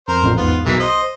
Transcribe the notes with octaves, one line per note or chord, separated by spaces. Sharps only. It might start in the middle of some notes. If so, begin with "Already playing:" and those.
F2 A#4 C5
A1 F2 A#2
E2 G#2 B3 F4
B1 B2 E3 G#3 A#3 B6
C5 D#5 C6